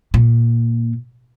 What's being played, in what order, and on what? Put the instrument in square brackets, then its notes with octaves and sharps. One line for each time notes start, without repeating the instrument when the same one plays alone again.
[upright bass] A#2